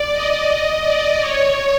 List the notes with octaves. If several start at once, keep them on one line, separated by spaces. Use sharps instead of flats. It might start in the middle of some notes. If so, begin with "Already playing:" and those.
Already playing: D5
D#5
D#5
D5
C#5